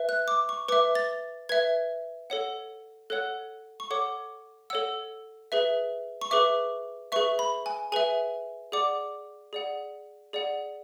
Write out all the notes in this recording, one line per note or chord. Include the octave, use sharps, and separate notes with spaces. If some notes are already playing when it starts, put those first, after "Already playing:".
Already playing: B4 E5
F#6
D6
C#6
B4 E5 D6
A6
B4 E5 G#6
A4 C#5 F#5
A4 C#5 F#5 F#6
C#6
A4 C#5 F#5 D6
A4 C#5 F#5 E6
G#4 B4 E5
C#6
G#4 B4 E5 D6
G#4 B4 E5 C#6
B5
G#5
G#4 B4 E5 G#5
G#4 D5 F#5 D6
G#4 D5 F#5
G#4 D5 F#5